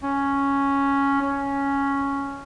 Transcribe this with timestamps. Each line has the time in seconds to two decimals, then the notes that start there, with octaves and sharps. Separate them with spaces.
0.03 C#4
1.21 C#4